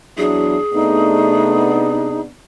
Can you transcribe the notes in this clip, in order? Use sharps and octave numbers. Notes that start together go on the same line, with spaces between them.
E2 F#3 D4 E4 G#4
C3 A3 B3 D4 D#4